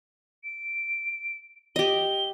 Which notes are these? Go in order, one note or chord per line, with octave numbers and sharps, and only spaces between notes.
D7
G4 D#5 G7